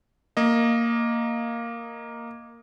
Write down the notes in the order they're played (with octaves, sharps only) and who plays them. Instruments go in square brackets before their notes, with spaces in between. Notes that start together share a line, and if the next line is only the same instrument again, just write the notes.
[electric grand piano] A#3 D#5